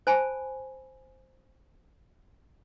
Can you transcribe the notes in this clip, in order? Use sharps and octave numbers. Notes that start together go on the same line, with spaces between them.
C5 G#5 A5 B5